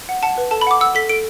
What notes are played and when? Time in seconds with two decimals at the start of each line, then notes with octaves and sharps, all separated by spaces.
0.09 F#5
0.23 F#5 A5
0.37 B4
0.51 A4 A5
0.61 B5
0.67 F#5 D6
0.81 F#5 E6
0.95 A4 B6
1.09 A4 D7